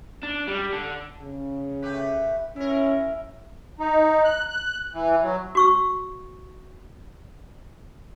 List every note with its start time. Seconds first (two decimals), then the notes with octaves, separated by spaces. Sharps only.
0.23 D4
0.47 G3
0.73 D3
1.22 C#3
1.82 A3 G4 B4
2.56 C#4 E4 A#4
3.80 D#4
4.25 F#6
4.49 F#6
4.94 E3
5.23 F#3
5.55 F#4 C#6 E6